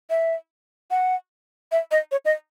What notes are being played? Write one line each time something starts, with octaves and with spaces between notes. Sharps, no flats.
E5
F#5
E5
D#5
C#5
D#5